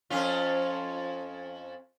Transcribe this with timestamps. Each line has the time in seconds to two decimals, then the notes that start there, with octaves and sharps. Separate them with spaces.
0.10 F2 C#4 F4